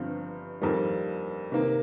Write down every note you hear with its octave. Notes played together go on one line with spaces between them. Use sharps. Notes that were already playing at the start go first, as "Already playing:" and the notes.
Already playing: G1 G2 F3 C4 F4
F2 D#3 G3 A#3 F4
C3 D#3 A#3